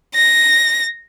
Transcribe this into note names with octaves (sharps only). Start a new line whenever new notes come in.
A#6